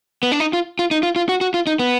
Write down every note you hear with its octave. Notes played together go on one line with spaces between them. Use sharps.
B3
D4
D#4
F4
F4
D#4
F4
F4
F#4
F#4
F4
D#4
B3